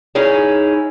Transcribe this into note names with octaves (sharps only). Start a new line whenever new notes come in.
C#4 D#4 E4 G#4 C#5